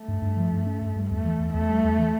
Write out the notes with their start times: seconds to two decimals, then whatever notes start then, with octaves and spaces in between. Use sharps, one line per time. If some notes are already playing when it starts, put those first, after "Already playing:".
Already playing: A3
0.08 G2
0.22 G2
0.37 F3
0.52 G2
0.66 C#4
0.81 G2
0.96 G2
1.10 E2 A3
1.25 E3
1.40 E2
1.54 E2 A3
1.69 G3
1.84 E2
1.98 E3